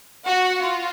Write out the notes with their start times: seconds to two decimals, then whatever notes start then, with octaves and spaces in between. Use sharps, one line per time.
0.28 F#4 F#5
0.63 F4